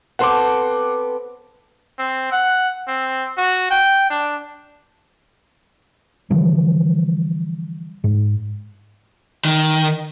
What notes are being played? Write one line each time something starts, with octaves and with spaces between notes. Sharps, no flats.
B3 C4 A4 F#5 C6 D6
C4
F#5
C4
F#4
G5
D4
D3 E3 F3 G3
G#2
D#3